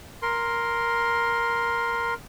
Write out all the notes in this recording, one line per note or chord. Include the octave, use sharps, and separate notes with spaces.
A#4 C6